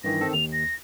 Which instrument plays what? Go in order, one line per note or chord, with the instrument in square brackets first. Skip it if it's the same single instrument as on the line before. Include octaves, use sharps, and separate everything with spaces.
[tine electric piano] G2 D#3 E3 [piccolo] A#6
[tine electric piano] D#3 C4 A4
[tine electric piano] D#2 [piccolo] F7
[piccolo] A#6